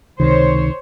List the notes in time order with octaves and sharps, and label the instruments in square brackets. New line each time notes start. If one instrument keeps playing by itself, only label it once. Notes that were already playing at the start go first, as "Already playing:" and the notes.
[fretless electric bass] C#2 C3 D#3 [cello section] C5 C#5